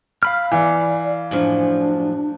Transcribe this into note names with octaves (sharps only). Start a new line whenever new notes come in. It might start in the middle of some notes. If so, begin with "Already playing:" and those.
F5 B5 F6
E3 D5
F#2 A2 F3 D4